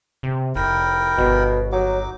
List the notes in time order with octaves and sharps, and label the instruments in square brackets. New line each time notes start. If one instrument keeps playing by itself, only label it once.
[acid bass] C3
[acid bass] F1 [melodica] E4 A#4 G5
[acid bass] G1 [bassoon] B2
[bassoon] F#3 [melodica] D#4 D6